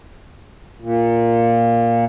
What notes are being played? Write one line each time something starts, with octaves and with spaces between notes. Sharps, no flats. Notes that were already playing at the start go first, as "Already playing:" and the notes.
A#2